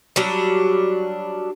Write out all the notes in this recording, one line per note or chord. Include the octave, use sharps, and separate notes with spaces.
F#3 G3 D4